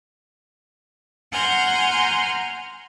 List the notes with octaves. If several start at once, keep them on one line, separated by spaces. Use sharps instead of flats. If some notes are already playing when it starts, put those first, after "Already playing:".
F#5 G#5 A#5 C6 F6 G6